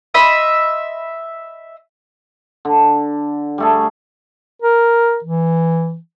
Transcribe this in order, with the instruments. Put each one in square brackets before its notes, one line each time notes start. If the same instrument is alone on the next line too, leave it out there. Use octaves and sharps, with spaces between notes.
[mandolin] D#5 E5 B5 C6
[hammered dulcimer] D3
G3 A3 G#4
[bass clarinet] A#4
E3